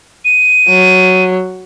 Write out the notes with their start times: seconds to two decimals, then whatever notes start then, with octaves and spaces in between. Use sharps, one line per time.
0.25 D#7
0.69 F#3